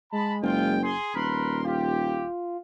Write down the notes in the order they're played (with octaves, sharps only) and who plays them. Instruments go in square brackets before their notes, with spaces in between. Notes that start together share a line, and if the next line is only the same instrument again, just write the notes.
[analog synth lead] G#3 [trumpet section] A5 B5
[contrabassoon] F#1 [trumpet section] F4 G5
[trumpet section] G#4 [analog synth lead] C6
[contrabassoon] D#1 [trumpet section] A#4 B4 C6 [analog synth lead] B5
[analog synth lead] F4 [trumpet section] G4